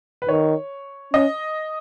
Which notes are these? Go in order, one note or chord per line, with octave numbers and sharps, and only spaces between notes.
B4
D#3 C#5
C#4 D#5